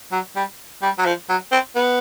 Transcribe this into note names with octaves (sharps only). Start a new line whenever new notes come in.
F#3
G3
G3
F#3
F3
F#3
C4
B3